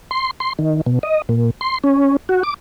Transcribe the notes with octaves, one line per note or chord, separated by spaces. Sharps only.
C6
C6
D#3
B2
D#5
A#2
C6
C#4
F#4
D6